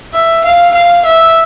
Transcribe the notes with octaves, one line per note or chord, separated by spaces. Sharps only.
E5
F5
F5
E5